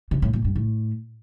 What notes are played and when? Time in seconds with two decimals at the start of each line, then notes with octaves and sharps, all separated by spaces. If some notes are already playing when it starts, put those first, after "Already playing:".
0.11 C3
0.22 A2
0.33 A#2
0.44 G2
0.55 A2